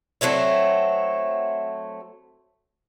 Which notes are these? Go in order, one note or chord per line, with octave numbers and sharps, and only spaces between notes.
F#3 A3 C4 E4